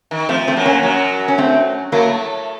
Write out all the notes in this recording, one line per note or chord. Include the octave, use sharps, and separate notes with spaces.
D#3
F3 A3 C4
A3 C4
F#2 F#3
A#3 C#4
F#2 F#3
C#4
A3 C4
A2 F#3 A3 A#3